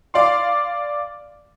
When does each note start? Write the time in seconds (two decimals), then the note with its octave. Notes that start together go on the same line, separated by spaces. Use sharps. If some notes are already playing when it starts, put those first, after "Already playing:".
0.14 D5 F5 C6